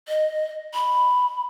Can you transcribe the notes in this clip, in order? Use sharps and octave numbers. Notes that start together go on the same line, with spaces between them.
D#5
B5